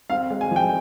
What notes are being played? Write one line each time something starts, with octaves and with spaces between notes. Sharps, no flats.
C4 F5
G#3
G#5
F3 G5